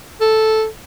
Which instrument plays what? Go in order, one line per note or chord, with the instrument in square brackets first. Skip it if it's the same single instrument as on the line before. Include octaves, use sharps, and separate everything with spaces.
[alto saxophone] A4